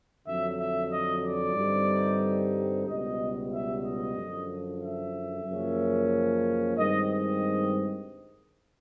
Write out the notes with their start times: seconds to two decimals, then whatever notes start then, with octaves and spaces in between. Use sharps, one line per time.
0.25 F2 D3 F#3 E5
0.58 E5
0.90 D#5
1.22 D5
1.55 G2 D3 G3 C4 D#4
2.85 C#2 B2 G3 D#5
3.51 E5
3.82 D#5
4.15 F#2 D3 F3
4.81 E5
5.46 F#2 C#3 F3 A#3 C#4
6.76 G2 D#3 G#3 C4 D#5
7.09 D#5